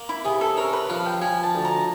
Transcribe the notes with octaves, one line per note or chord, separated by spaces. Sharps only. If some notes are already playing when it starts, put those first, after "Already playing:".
Already playing: A#3
E4
C3 G#4
A4
C#4 A#4
B4
F3 F5
G5
F3 G#5
A5
D2
A#5